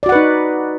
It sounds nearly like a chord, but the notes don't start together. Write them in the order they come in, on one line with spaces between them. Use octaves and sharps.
D5 F#4 F#5 B4 D#4